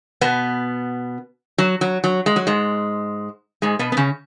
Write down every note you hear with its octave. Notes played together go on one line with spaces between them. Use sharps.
B2 B3
F#3
F#3
F#3
G#3
F#3
G#2 G#3
G#2 G#3
B2 B3
B3
C#3 C#4